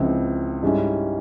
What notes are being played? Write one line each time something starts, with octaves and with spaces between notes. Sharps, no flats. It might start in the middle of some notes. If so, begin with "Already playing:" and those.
Already playing: C#2 C#3 F3 C4 E4
G#2 G3 C#4 E4